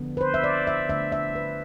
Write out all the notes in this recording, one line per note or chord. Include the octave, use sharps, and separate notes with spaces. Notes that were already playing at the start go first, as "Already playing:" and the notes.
Already playing: D3 F3 B3 D4
B4
C5
E5
D5
E5
D3 A3 D4 E5
E5
B4